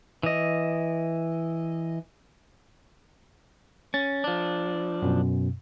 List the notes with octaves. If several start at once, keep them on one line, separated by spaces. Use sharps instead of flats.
E3 D#5
C#4 A6
F3 D4
F#2 B2